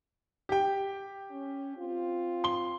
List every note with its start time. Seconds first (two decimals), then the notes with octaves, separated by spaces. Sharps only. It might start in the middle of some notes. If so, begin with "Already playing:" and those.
0.49 G4 G5
1.31 C#4
1.76 C4 F4
2.44 C6 G7